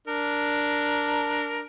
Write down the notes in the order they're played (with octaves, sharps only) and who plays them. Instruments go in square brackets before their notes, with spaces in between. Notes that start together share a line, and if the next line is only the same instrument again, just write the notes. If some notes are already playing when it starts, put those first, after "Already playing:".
[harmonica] D4 A#4